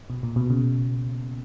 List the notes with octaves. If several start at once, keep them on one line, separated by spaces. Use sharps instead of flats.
B2
A#2
B2
C#3